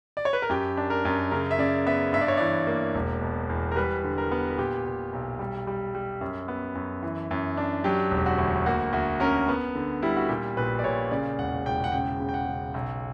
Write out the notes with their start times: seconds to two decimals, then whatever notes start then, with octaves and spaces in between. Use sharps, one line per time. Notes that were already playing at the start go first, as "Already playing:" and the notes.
0.17 D5
0.25 C#5
0.33 B4
0.42 A#4
0.50 F#2 G4
0.77 D4
0.90 A#4
1.05 F#2
1.31 C#3 A#4
1.51 E5
1.59 C#3 D5
1.87 B3 E5
2.13 G2 E5
2.21 D5
2.28 C#5
2.37 E3 D5
2.67 A#3
2.95 E1
3.21 B2
3.49 E2
3.72 A#4
3.76 G3 B4
4.04 D3
4.18 A#4
4.31 B3
4.47 A#4
4.58 A#2 G4
4.86 A#2
5.13 B1
5.39 G3
5.67 G3
5.95 G3
6.21 F#2
6.48 B3
6.75 F#2
7.03 E3
7.31 F#2
7.57 D4
7.84 F#3 G4
8.11 E1
8.26 F#4
8.39 D2
8.66 A#3 F#4
8.93 D2 F#4
9.20 C#4 A#4
9.48 B3
9.75 D3
10.03 G3 E4
10.16 F#4
10.29 A#2 G4
10.57 A#1 B4
10.79 D5
10.84 A#2 C#5
11.11 C#3 D5
11.38 E1 F#5
11.66 E1 G5
11.84 F#5
11.92 C#3 G5
12.20 C#3
12.29 G5
12.34 F#5
12.47 C#3
12.74 B1